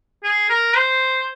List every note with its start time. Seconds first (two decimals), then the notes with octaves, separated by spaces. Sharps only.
0.24 G#4
0.50 A#4
0.76 C5